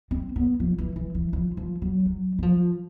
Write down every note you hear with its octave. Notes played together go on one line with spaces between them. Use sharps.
C4
B3
F3
E3
E3
E3
F3
F3
F#3
F#3
F#3
F3